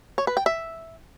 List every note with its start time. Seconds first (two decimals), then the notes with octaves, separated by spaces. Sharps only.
0.18 C#5
0.27 B4
0.37 G5
0.46 E5